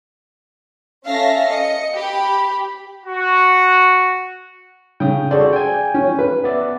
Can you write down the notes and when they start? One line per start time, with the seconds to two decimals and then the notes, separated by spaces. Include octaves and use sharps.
1.06 C#4 A4 E5 F5 A#6 B6
1.49 D#5 C#7
1.95 G4 B5
3.06 F#4
5.00 C#3 G5 D#6
5.31 F#4 G#4 A4 C5 D5
5.53 G5 G#5
5.94 C#4
6.19 B4
6.44 B3 D5 E5